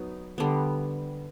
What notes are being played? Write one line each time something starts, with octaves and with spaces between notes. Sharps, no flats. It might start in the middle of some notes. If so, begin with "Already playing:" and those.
Already playing: F#3 B3 D#4
D3 G3 B3